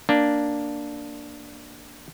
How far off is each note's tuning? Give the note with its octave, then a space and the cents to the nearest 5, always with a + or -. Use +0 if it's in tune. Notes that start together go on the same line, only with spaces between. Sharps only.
A#3 +0 D4 +0